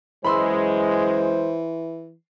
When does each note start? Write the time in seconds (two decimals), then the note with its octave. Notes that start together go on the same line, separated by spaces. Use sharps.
0.24 F#2 E3 G#3 C5 B5 C6 E6